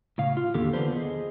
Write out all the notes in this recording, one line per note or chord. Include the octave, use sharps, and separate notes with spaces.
A2 C#3 F5
F4
E2 D3 D#3 A#3 G4 A4
D3 E3 B3 D4 B4 C5
G#4 D#5